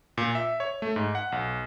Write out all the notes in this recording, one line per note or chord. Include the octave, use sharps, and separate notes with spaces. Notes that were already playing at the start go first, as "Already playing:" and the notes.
A#2
E5
C#5
A3
G#2
F#5
B1